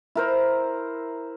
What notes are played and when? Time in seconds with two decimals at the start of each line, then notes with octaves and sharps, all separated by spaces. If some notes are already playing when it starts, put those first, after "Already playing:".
0.15 E4 A#4 C5